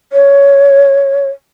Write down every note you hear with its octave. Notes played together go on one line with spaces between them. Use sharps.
C#5